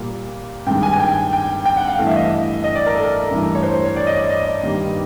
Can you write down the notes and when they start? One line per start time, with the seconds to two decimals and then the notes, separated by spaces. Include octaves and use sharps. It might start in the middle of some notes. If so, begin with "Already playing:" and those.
Already playing: A#2 G3 A#3
0.66 G2 D#3 G#3 G5
0.83 G#5
0.93 G#5
1.00 G5
1.33 G5
1.65 G5
1.77 F#5
1.87 F5
1.98 G2 E3 A3 F5
2.07 E5
2.16 D#5
2.25 E5
2.64 D#5
2.75 D5
2.86 A#4
2.95 A4
3.04 A#4
3.31 G2 E3 A3
3.55 C#5
3.63 C5
3.85 C#5
3.96 D5
4.07 D#5
4.18 D5
4.29 D#5
4.63 G2 D#3 G3 A#3